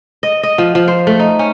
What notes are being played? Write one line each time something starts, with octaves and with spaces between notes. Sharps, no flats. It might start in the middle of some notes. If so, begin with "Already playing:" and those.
D#5
D#5
F3
F3
C5
A3
D#4
C#4